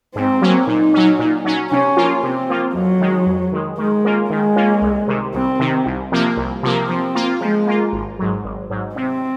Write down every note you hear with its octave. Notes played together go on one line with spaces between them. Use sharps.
G#2 C4
F#3 A#3 C#4
A#2 D#4
F#3 C#4
A#2
F#3 C#4
C3 C#4
F3 A#3 F4
C3 C4
F3 A#3 F4
F2 F#3
D#3 G#3
F2
D#3 G#3
D#3 G#3
A#3 C#4 F4
D#3 G#3
A#3 C#4 F4
C2
C3 D#3
C2 C4
C3 D#3
C2
C3 F3 A#3
C2
C3 F3 A#3
F3 C4
A#3 F4
F3 G#3
A#3 F4
G#1
G#2 F#3
G#1
G#2 F#3
C3 C4